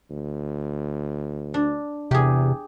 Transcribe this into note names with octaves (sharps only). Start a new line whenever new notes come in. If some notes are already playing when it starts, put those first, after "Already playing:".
D2
D4
E2 C3 G4 G#4